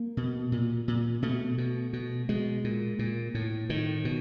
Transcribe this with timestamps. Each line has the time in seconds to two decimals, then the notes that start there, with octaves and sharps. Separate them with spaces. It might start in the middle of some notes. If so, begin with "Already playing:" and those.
Already playing: A#3
0.17 B2
0.52 A#2
0.88 A#2
1.22 B2 A3
1.58 B2
1.93 B2
2.29 B2 G#3
2.64 A#2
2.99 A#2
3.35 A2
3.69 A2 D#3
4.05 B2